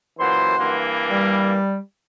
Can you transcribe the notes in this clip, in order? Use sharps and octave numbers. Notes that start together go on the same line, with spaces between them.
F#2 A#2 E3 C5 F#5 C6
G2 E3 A#3
G3